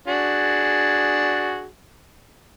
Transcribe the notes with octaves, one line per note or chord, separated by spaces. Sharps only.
D4 F#4 G#4